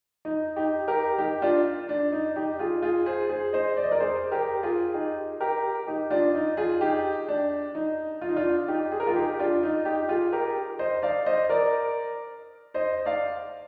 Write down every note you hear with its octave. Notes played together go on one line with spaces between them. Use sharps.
D#4
D#4 G4
G4 A#4
D#4 G4
D4 F4
D4
D#4
D#4 G4
F4 G#4
F4 G#4
G#4 C5
G#4 C5
C5 D#5
D5
D#5
A#4 D5
G#4 C5
G4 A#4
F4 G#4
D#4 G4
G4 A#4
D#4 G4
D4 F4
D#4
F4 G#4
D#4 G4
D4
D#4
F4
D#4
D4 F4
D#4 G4
G#4
A#4
F4 G#4
D#4 G4
D4 F4
D#4
D#4 G4
F4 G#4
G4 A#4
C5 D#5
D5 F5
C5 D#5
A#4 D5
C5 D#5
D5 F5